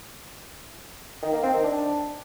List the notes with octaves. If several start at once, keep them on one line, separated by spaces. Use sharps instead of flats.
D#3
A#3
C4
D#3
D4